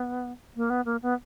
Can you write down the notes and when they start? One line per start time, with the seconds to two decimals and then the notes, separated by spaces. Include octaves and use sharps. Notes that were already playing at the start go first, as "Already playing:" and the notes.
Already playing: B3
0.56 A#3
0.70 B3
0.85 A#3
1.02 B3